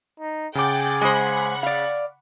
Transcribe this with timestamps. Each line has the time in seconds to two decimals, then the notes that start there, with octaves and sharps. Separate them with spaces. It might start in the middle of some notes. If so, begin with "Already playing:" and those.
0.20 D#4
0.55 C#3 G#4 F#5 G5 D6 A6
1.01 G#3 C5 F#5 B5 C#6
1.63 D5 F5